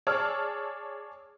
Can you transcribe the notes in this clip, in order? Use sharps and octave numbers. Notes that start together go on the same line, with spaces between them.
G#4 C#5 D5 A5 E6 F6